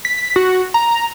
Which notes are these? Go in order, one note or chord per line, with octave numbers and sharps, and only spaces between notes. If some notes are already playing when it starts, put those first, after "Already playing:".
B6
F#4
A#5